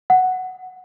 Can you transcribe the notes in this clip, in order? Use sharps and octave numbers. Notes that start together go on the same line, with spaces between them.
F#5